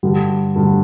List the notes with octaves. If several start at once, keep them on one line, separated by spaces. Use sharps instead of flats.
G2 D3 G3
G2 D3 G3